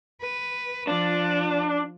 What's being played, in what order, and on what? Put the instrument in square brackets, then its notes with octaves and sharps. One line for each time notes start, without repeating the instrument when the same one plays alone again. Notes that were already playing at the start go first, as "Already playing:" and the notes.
[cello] B4
[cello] F3 F4 [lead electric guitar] D4